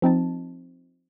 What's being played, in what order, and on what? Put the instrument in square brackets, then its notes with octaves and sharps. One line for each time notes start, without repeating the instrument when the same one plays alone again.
[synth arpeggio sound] F3 C4 D#4 A5